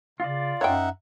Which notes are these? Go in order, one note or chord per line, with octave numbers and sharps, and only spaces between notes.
C#3 F4 D5
F#2 D#4 C#5 E5 F#5 G5